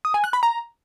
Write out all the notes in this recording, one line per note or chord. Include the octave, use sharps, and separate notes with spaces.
D#6
G#5
F#6
B5
A#5